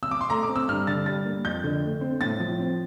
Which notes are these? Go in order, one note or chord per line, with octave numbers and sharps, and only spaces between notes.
E6
D6
C6
A3 A#5
D6
C4
E6
G2 F6
D3 A6
G3 A6
A#3
F2 G6
D3
A3
C4
A2 A6
F3
C4